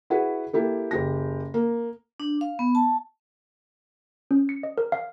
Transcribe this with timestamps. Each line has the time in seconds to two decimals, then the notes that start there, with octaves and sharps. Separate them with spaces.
0.10 E4 F#4 G#4 B4 F#5
0.53 A#3 E4 G4 A4
0.91 F#1 G4 A#6
1.54 A#3
2.20 D4
2.41 F5
2.59 B3
2.75 A5
4.31 C#4
4.49 C#7
4.63 D#5
4.78 A#4
4.92 F5